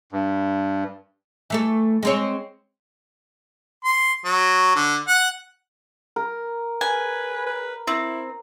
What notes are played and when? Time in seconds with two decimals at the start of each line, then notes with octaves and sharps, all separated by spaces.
0.12 G2
1.50 E3 A3 A4
2.03 G#3 C4 C#5
3.85 C6
4.25 F#3
4.75 D3
5.08 F#5
6.16 A#4
6.81 B4 G#5
7.47 B4
7.87 C4 E4